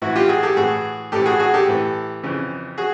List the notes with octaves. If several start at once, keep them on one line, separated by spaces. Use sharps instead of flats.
A2 E3 E4 F#4
F4 G4
F#4 G#4
G4 A4
A2 E3 F#4 G#4
A2 E3 G4 A4
F#4 G#4
F#4 G#4
G4 A4
A2 E3
F2 C#3 E3
F#4 G#4